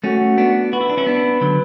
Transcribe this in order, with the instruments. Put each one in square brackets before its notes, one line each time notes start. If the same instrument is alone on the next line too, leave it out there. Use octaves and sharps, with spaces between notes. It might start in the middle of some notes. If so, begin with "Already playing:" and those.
[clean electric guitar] A3 C#4 [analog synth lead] F#4
[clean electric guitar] B3 D4
[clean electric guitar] F#4 [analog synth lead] B4
[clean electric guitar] E4
D4
C#4 E4
B3 D4
D3 F#3